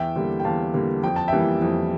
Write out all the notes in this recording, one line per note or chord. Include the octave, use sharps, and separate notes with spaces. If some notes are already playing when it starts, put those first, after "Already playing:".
Already playing: E2 E5 G5
D3 G3 A#3
G5
E2 F5 A5
D3 G3 A#3
F2 G5
A5
E3 G3 A#3 E5 G5
F2